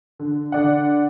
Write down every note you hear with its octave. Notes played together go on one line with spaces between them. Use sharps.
D3
D3 D5 F#5